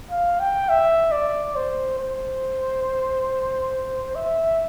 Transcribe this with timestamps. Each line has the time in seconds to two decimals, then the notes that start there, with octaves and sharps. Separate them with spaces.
0.11 F5
0.40 G5
0.69 E5
1.12 D5
1.56 C5
1.99 C5
4.16 E5